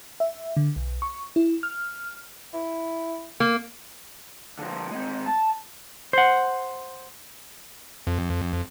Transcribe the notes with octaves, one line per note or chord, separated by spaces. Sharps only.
E5
D3
B1
C#6
E4
F6
E4
A#3
D3 F3
G#3 C4
A5
C5 F#5
F2